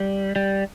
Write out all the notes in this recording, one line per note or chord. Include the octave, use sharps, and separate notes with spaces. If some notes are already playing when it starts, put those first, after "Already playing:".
Already playing: G3
G3